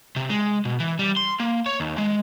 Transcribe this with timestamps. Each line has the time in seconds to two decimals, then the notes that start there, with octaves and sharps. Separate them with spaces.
0.16 C3
0.30 G#3
0.65 B2
0.80 E3
0.99 G3
1.17 C6
1.40 A#3
1.66 C#5
1.80 D#2
1.98 G#3